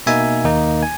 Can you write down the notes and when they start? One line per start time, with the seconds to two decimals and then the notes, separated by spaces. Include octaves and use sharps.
0.06 B2 A#3 D#4 E5 G#5
0.45 D#2 D#3 A#3 D#4
0.83 G#5